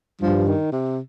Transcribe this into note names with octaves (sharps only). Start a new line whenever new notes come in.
G2 F3
D#3
C3